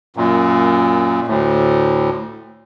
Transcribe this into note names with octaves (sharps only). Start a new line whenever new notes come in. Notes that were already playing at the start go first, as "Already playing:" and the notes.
F#2 A#2
D2 A2